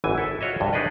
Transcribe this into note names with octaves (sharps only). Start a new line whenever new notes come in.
G#1 F#2 E3 G#5
E4 A4
F4 F#4 C#5 D#5 E5
C2 G2
D4 D#4 G#4 B4 D5 D#5